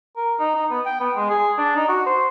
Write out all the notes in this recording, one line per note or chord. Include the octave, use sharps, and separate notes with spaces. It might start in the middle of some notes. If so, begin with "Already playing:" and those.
A#4
D#4
D#4
B3
G5
B3
G#3
G#4
D4
D#4
F#4
C5